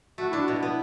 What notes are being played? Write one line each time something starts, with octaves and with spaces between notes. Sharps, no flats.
A3 F#4
D4 E4
F#4
B2 E4
F#4
B3 E4